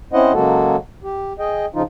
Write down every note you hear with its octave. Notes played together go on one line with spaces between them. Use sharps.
C4 C#4 E4 C5 D#5 F#5
C#3 F#3 G#3 A#3 F#4 A4
G4
G#4 D#5 G5
C#3 F3 D#4 F4